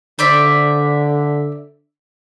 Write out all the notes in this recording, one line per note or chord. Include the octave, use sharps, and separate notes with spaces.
D3 C5 D5 E5